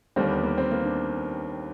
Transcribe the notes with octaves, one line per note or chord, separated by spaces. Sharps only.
D#2 D3 G3 A#3 C4
B3
A#3
C4
A#3
D4